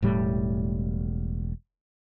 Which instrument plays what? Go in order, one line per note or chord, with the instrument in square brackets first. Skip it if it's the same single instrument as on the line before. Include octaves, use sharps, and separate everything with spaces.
[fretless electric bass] E1 A2 G3